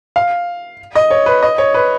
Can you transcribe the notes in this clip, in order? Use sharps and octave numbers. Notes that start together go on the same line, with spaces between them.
F5
D#5
C#5
B4
D#5
C#5
B4